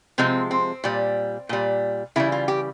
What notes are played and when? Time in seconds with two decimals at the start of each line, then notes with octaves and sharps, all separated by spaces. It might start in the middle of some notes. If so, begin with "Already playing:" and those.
0.18 C3 F3 G#3 C4
0.51 C4
0.84 A#2 G3
1.49 A#2 G3
2.16 C#3 E3 G3 E4
2.32 F4
2.48 G4